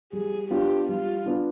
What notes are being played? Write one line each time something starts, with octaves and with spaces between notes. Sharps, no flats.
G3 G#4
B3 D4 F4 G4
G3 F4
B3 D4 F4